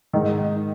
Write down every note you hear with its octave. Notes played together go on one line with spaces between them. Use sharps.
G#2 D#3